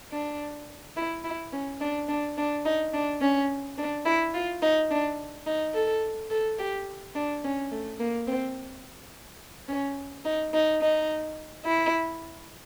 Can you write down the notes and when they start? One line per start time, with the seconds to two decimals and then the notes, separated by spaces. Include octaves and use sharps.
0.12 D4
0.97 E4
1.24 E4
1.53 C#4
1.81 D4
2.08 D4
2.38 D4
2.65 D#4
2.94 D4
3.21 C#4
3.78 D4
4.05 E4
4.34 F4
4.62 D#4
4.91 D4
5.46 D#4
5.74 A4
6.30 A4
6.59 G4
7.15 D4
7.44 C#4
7.71 A3
8.00 A#3
8.27 C4
9.68 C#4
10.25 D#4
10.53 D#4
10.81 D#4
11.65 E4